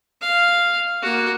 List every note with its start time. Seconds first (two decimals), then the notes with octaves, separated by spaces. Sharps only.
0.21 F5
1.02 A#3 F#4